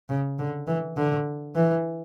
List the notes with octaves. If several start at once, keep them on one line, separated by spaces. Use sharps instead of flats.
C#3
D3
E3
D3
E3